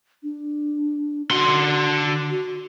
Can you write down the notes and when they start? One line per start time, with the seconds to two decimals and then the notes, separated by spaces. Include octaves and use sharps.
0.23 D4
1.31 D3 F#4 C6
2.30 F#4